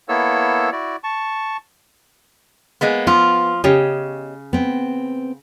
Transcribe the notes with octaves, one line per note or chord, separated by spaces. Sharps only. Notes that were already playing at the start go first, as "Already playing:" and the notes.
A#3 B3 E4 A4 C#5 E6
E4 F#4 D5
A5 C#6
G#3 A#3 B3
F3 B3 F4
C#3 G4 C#5 D#5
B3 C4